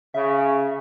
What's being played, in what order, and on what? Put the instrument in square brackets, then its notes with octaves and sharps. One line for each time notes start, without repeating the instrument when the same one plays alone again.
[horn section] C#3 [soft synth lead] E5